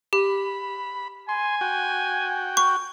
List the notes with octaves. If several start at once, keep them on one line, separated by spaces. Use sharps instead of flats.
G4 B5
G#5 C6
F#4 G5
C#6